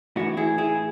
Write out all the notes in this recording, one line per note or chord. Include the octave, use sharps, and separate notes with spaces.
A2 E3 D4 F#4
E4 G#4
E4 G#4